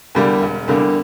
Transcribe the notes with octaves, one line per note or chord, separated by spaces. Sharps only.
E2 D3 G3 A#3
E1
E2 D3 G3 A#3